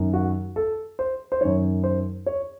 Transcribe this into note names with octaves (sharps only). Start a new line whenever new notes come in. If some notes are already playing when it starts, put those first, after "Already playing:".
Already playing: F#2 D#3
F#4
A4
C5
C5
F#2 D#3 C#5
C5
C#5